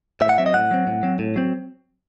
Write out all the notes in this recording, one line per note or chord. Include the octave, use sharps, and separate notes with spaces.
A2 E5
F#5
F#3 C4 E5
D#5
A2 F#5
F#3 C4
A2
F#3 C4
A2
F#3 C4